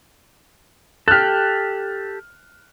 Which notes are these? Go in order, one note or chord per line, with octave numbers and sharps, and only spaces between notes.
G4 A4 F6 F#6